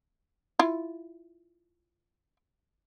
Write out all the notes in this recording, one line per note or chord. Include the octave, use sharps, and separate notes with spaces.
E4 F4